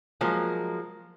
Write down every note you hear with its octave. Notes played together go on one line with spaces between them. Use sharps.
F3 F#3 G#3 A#3